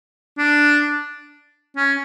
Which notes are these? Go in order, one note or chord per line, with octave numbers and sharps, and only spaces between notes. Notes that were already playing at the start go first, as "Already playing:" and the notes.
D4
C#4